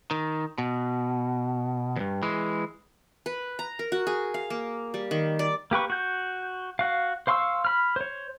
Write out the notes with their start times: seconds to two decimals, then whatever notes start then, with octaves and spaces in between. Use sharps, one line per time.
0.11 D#3
0.58 B2
1.96 E2 G2
2.23 E3 G#3
3.26 B4
3.59 A#5
3.79 A#4
3.92 F#4
4.07 G#4
4.34 F5
4.50 A#3
4.94 G3
5.11 D#3
5.39 D5
5.71 A#3 G4 B4 C#6
5.90 F#4 G6
6.79 F#4 F5
7.27 C5 F5 C6 C#6 E6
7.65 B5 F6
7.96 C5 C#5